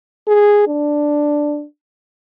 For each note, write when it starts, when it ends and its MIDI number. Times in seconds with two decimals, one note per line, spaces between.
0.28 0.65 68
0.68 1.65 62